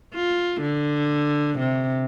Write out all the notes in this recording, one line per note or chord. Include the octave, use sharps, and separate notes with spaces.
F4
D3
C3